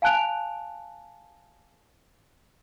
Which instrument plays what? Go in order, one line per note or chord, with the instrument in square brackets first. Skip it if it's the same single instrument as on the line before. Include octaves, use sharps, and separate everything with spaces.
[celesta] F5 G#5 A5 F#6 D7 F7